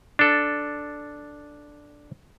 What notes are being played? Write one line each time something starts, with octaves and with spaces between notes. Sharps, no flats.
D4 A4